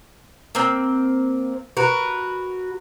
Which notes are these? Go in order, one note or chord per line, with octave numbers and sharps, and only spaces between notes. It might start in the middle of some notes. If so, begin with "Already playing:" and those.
A#3 C4
F#4 A#4 B4